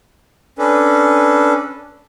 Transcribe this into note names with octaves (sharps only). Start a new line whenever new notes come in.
C#4 D4 A4 B4